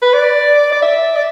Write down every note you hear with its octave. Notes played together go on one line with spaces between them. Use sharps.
B4
D5
D5
E5
D5